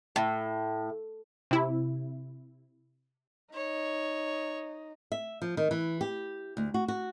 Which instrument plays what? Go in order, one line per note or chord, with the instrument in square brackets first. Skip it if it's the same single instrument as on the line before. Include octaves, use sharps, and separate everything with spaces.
[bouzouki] A2
[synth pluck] C3 E4
[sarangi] D#4 [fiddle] C#5
[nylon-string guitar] E5
F3
D#3
E3
G4
D2
F#4
F#4